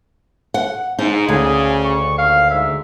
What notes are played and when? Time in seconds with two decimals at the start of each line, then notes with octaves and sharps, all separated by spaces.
0.54 F#5
0.99 G#2 D#4
1.29 D2 C#3 G#4
1.85 C#6
2.19 D#2 F5
2.51 G#2 E5